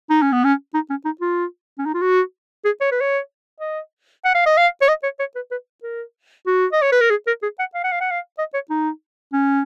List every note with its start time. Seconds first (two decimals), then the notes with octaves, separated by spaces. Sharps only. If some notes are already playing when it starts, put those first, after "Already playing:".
0.10 D#4
0.22 C#4
0.32 B3
0.44 C#4
0.74 D#4
0.90 C#4
1.05 D#4
1.21 F4
1.78 C#4
1.86 D#4
1.94 F4
2.01 F#4
2.65 G#4
2.81 C#5
2.91 B4
3.01 C#5
3.60 D#5
4.25 F#5
4.35 F5
4.46 D#5
4.57 F5
4.82 C#5
4.88 D#5
5.03 C#5
5.19 C#5
5.35 B4
5.51 B4
5.83 A#4
6.47 F#4
6.73 D#5
6.82 C#5
6.92 B4
7.01 A#4
7.10 G#4
7.27 A#4
7.43 G#4
7.59 F#5
7.74 F5
7.84 F#5
7.92 F5
8.01 F#5
8.11 F5
8.39 D#5
8.54 C#5
8.70 D#4
9.33 C#4